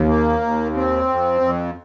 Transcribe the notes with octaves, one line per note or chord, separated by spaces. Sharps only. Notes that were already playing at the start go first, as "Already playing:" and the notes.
Already playing: D#2
A#3
D#2
C4
F2
F2